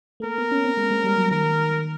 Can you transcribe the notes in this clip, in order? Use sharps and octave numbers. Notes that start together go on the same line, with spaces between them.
A3
A#3 A#4
B3
C#4
C4
G#3
G#3
G3
F#3
D#3 A#4